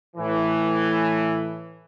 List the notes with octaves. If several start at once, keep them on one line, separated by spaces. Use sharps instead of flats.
A2 E3